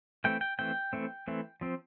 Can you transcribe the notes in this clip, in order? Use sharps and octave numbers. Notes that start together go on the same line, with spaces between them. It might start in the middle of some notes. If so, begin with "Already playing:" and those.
E3 A3 C4 G5
G5
E3 A3 C4 G5
E3 A3 C4
E3 A3 C4
F3 C4